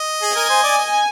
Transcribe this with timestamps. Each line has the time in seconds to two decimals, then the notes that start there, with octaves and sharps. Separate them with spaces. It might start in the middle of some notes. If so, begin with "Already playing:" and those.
Already playing: D#5
0.22 G#4
0.33 A#4 G#5
0.50 C5
0.63 D5
0.78 D#5